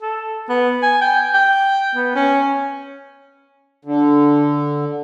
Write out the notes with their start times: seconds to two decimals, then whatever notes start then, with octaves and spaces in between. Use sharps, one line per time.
0.02 A4
0.49 B3
0.83 G#5
1.01 G5
1.34 G5
1.95 B3
2.15 C#4
3.85 D3